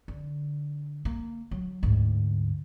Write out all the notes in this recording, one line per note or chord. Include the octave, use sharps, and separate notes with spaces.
D3
A#3
F#3
D2 G#2